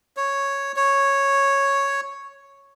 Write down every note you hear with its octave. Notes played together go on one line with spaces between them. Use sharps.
C#5
C#5